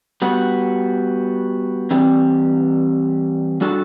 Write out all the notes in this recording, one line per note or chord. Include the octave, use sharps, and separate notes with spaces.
G3 B3 F#4
E3 G3 C4
G3 D4 F#4 A4